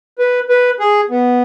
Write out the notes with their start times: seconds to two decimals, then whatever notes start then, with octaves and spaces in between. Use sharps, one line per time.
0.19 B4
0.49 B4
0.80 G#4
1.10 B3